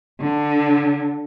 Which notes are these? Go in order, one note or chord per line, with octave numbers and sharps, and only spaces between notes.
D3